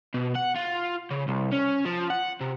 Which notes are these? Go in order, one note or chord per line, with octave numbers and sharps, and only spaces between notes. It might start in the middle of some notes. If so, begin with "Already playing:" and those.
B2
F#5
F4
C#3
C2
C#4
F3
F#5
C3